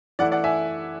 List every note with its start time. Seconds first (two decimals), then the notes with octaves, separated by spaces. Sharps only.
0.19 E3 A3 E4 D5 F#5
0.32 D5 F#5
0.44 E5 G#5